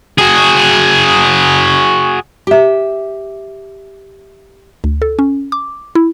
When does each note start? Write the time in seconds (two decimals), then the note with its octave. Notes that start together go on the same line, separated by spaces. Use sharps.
0.19 F#4 G#4
2.47 G4 E5
4.84 D2
5.02 A4
5.19 C#4
5.52 D6
5.95 E4